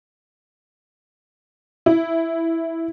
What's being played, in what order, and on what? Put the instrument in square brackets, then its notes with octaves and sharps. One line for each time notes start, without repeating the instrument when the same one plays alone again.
[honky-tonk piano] E4